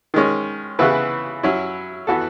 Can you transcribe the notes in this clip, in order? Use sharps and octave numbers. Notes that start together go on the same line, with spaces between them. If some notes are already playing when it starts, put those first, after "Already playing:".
D#3 G#3 C#4
C#3 E3 B3 E4 B4
F#3 C#4 E4
E3 B3 F#4 A4